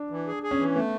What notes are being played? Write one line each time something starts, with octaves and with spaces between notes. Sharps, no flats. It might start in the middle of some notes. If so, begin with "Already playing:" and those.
Already playing: D4
E3
G#4
G#4
C#4
E3
A3 B3